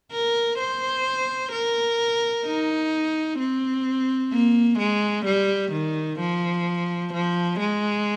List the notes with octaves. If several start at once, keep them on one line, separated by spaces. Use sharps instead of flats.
A#4
C5
A#4
D#4
C4
A#3
G#3
G3
D#3
F3
F3
G#3